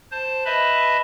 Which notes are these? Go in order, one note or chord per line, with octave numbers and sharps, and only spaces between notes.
C5 A5
B4 D#5 E5 A5 B5